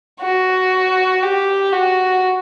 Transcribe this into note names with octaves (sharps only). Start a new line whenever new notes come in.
F#4
G4
F#4